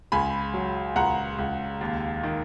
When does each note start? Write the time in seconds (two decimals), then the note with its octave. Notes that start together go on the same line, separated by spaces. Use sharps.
0.12 C#2 G#5 B5
0.54 F#3
0.96 C#2 F#5 A#5
1.39 C#2
1.81 D#2
2.23 D#3